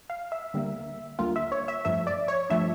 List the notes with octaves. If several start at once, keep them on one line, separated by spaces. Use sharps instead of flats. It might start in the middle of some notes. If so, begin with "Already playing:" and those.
F5
E5
D2 D3 G3 A#3
D2 D3 G3 A#3 F4
E5
C#5
E5
G2 F3 A3 E5
D5
C#5
G2 F3 A3 E5